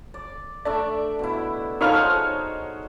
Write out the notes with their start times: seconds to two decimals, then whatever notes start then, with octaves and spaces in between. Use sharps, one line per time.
0.14 D5
0.65 A3 D4 D5 E5
1.19 B2 E4
1.81 F3 D#4 A4 C#5 F6
1.92 G#4 C5 F#5